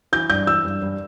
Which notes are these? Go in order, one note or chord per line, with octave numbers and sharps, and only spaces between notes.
E3 G6
G2 G6
E3 E6
G2
G2